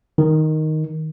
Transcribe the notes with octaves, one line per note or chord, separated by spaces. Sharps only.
D#3